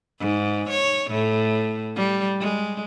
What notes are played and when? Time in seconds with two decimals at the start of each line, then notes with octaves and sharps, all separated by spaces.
0.20 G#2
0.70 C#5
1.11 A2
1.96 G3
2.40 G#3